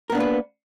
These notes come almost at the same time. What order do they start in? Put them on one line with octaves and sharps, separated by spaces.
A#4 B3 D4 A#3 B4